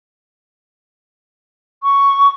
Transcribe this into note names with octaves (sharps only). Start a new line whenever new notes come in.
C#6